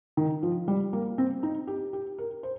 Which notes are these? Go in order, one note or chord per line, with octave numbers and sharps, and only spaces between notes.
D#3
F3
G3
A#3
C4
D#4
G4
G4
A#4
C5